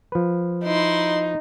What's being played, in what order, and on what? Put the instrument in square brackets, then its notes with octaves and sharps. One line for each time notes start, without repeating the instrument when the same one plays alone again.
[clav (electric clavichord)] F3 B4
[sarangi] D#4 [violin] E4 C6